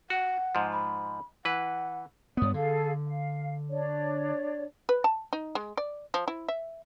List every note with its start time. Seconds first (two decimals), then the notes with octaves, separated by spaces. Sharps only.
0.10 F#4 F#5
0.55 G#2 F3
0.72 B5
1.45 E3 B4 F#5
2.37 G2 B3 C#5 D5 D#6
2.54 D3 G#4 A4 F5
3.06 F5
3.70 D4 C#5 D5
4.89 B4
5.04 A5
5.33 D#4
5.55 G#3
5.77 D5
6.14 F3
6.28 E4
6.48 E5